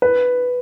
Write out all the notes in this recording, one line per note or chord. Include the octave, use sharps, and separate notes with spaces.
B4